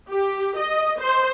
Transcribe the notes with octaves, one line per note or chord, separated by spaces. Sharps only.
G4
D#5
C5